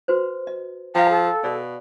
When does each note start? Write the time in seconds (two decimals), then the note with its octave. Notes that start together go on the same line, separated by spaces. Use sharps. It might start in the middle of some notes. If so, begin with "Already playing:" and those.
0.08 F#4 B4 C5
0.47 D#5
0.95 F3 F5 G5 A#5
1.09 A4
1.44 B2 G#4 D5